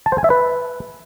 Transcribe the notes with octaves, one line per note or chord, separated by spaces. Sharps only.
A5
C5
G#5
E5
B4